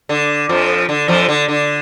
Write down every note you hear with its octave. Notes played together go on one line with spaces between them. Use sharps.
D3
F2 F3
D3
F2 F3
D3
D3